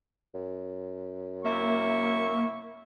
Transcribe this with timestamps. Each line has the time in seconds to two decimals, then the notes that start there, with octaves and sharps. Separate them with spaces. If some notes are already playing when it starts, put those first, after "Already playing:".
0.35 F#2
1.44 C3 A#3 E4 E5 C#6